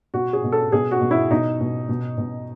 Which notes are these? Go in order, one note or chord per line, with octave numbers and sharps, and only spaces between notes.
B2 F#4
G#4
B2
A4
B2 G#4
F#4
B2
E4
B2 D#4
B2
B2
B2